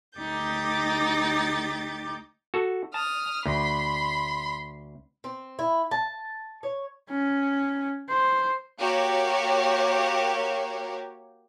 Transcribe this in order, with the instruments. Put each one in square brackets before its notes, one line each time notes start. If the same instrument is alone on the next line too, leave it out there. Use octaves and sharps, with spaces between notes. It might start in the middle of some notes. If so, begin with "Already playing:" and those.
[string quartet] D2 D#4 G4 D6 G6 A6
[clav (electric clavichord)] F#4 A4
[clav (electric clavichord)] A5 [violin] D#6 F6
[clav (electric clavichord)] D2 [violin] B5 C6
[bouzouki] C4
E4
A5
C#5
[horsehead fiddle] C#4
C5
[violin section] A#3 F#4 G4 C#5